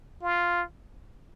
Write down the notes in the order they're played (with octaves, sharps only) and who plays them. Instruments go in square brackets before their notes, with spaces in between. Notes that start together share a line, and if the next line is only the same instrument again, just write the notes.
[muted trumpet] F4